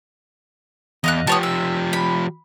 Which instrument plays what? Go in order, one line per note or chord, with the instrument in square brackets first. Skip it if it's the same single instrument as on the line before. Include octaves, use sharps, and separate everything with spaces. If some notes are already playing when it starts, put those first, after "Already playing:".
[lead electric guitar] E2 [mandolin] D#5 F5 F#6
[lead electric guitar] F3 G4 [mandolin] B3 C#5 A5
[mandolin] E5
B5